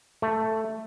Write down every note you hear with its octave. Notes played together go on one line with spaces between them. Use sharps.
A3